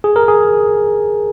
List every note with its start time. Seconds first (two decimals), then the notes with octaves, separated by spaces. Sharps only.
0.04 G#4
0.16 A#4
0.28 G#4